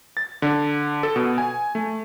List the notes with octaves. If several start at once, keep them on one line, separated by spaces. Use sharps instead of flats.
A6
D3
A4
B2
G#5
A3